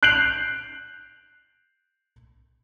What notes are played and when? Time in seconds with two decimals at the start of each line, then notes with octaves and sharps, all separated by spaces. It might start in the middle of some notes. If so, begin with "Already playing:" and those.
0.03 F#6 G6 C7 D7 F7 F#7